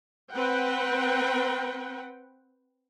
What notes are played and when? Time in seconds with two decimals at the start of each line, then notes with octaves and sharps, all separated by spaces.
0.32 C4 B4 F#5 G5